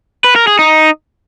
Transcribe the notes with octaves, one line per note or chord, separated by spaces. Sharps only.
B4
A#4
G#4
D#4